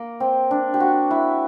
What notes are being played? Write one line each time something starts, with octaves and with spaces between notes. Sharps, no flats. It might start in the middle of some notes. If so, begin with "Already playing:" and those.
Already playing: A#3
C4
D4
G4
F#4
E4